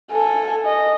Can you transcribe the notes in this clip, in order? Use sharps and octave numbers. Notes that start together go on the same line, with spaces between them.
A4 G#5
D#5